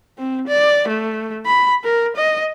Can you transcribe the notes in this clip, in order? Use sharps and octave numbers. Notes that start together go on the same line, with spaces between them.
C4
D5
A3
B5
A#4
D#5